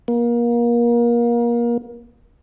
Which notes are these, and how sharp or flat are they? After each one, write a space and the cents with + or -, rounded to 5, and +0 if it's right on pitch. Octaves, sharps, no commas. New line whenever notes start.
A#3 +30